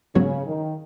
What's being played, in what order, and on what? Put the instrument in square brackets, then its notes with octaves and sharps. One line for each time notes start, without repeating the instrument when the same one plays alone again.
[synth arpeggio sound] G#2 F#3 B3 F#4 C#5 [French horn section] C#3
[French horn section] D#3